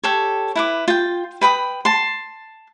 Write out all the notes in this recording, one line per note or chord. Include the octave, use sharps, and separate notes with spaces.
G4 A4 C#5
E4 B4 D6
F4 G5
B4 G5 B5 D#6
A5 C6